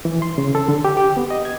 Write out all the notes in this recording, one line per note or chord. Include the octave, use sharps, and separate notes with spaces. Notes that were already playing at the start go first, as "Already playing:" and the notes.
E3
C6
C#3
A4
D3
G4
G4
B3
D#5
G#6